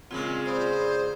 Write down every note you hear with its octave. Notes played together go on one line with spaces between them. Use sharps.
A#2 C#3 G#3 C4 F4
C5 D5 B5 D#6